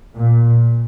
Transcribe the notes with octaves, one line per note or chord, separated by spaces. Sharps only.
A#2